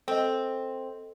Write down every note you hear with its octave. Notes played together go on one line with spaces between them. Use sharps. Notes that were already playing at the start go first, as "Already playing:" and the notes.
C4 A4 D#5